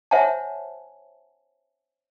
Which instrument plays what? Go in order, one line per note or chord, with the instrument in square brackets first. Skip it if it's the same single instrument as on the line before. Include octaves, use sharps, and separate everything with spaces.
[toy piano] C5 C#5 E5 F#5 G#5 A5